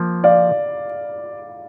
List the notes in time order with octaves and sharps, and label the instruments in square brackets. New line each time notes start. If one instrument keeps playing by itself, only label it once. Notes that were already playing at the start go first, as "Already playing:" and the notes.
Already playing: [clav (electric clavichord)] F3 A#3
[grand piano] D5 F5